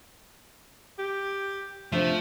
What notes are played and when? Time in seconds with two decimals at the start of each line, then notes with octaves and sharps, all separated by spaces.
0.99 G4
1.92 C3 F3 A3 D4 E5